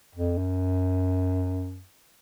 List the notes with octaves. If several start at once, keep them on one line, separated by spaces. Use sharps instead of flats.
F2
F#2